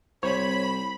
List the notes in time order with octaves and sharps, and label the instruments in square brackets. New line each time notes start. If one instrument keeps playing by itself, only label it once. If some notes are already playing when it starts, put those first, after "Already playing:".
[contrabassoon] C2 [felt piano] C5 [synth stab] C#5 [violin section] B5